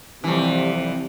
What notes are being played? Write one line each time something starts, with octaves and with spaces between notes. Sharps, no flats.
F2 C3 E3 G3